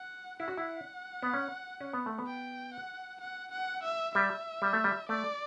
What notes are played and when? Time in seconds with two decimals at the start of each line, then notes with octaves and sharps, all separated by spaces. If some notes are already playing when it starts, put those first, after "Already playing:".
Already playing: F#5
0.40 E4 F#5
0.48 F#4
0.57 E4
1.23 B3
1.34 C#4
1.81 C#4
1.93 B3
2.06 A3
2.18 B3
2.27 G5
2.74 F#5
3.21 F#5
3.52 F#5
3.83 E5
4.15 G3 E5
4.62 G3
4.73 A3
4.84 G3
5.09 A3 D5